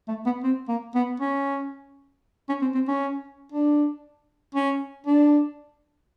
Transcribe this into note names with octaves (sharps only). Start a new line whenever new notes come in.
A3
B3
C4
A#3
B3
C#4
C#4
C4
C4
C#4
D4
C#4
D4